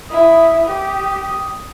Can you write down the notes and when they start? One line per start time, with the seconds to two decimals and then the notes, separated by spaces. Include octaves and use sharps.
0.11 E4 D#6
0.67 G4